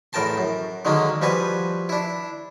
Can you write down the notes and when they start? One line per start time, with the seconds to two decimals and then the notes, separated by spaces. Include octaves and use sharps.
0.13 E2 A2 A#4 G5 A5 C6
0.38 F#2
0.85 D3 D#3 F#3 G#3 A#3 C#4
1.21 F3 G3 F#4 B4 G#5
1.89 D4 E4